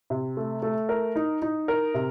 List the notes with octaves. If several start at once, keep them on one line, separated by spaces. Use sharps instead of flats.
C3
A3
A3
A#4
D#4
D#4
A#4
C3